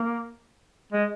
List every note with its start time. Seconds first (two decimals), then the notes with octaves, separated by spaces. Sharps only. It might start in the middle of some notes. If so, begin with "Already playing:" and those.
Already playing: A#3
0.93 G#3